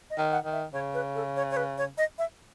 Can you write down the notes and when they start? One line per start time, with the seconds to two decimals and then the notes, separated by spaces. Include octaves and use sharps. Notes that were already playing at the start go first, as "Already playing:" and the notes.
0.10 D#5
0.18 D#3
0.32 F#5
0.45 D#3
0.52 E5
0.73 C#3 C#5
0.94 B4
1.15 A4
1.36 C#5
1.51 C#5
1.57 B4
1.78 C#5
1.98 D#5
2.19 E5